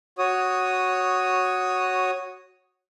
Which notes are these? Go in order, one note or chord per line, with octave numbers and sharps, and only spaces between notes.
F#4 C#5 D#6